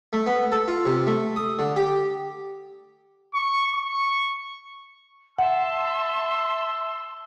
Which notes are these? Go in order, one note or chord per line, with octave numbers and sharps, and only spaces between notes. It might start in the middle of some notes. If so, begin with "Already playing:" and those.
A3
B3
A4
F4
C3
A3
D#6
D3
G4
C#6
C#6
E5 F#5 A5 C6 E6